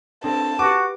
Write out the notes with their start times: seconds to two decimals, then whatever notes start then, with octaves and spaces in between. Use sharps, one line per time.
0.24 C4 D4 A4 A5
0.59 F#4 G4 B4 D6